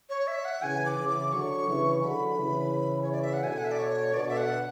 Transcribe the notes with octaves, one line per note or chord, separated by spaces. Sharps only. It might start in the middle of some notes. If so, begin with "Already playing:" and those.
C#5
E5
F#5
C#3 E3 G#5
D6
C#3 E3
D6
D3 F#3 C#6
C#3 E3
D3 F#3 B5
C#3 E3
C#5
D5
E5
F#5
B2 D3 G#5
F#5
E5
D5
C#5
B2 D3 D5
E5
F#5